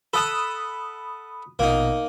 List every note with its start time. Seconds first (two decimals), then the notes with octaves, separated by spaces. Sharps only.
0.14 A4 F#5 A5 B5 D#6
1.59 A#1 B2 A#3 D#4